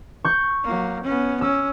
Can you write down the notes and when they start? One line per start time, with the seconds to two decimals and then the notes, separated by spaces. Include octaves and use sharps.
0.24 C#6 G6
0.64 F#3 A#3
1.04 B3 C#4
1.41 C#4 E6